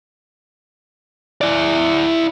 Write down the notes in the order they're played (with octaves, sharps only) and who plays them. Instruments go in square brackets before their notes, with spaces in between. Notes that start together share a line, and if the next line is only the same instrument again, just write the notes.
[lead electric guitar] E4 D5